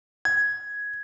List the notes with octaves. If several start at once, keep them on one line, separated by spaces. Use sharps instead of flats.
G#6